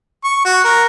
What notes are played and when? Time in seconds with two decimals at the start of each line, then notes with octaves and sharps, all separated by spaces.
0.24 C#6
0.45 F#4
0.65 A#4